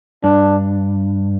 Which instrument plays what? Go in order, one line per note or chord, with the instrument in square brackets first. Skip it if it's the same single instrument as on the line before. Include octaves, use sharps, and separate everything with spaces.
[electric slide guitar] G2 [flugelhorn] D4